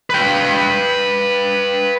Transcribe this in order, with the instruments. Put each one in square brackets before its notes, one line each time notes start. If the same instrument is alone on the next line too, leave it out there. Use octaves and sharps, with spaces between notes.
[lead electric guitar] B4 G5